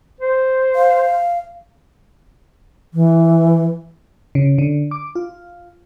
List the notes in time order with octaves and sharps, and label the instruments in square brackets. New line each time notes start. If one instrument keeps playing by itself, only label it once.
[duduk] C5
[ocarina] F5
[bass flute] E3
[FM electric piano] C#3
D3
D6
F4